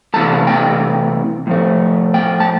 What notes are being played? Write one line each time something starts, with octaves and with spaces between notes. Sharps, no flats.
C3 E3 A3 A5
G5
A2 F3 A3
G5
A5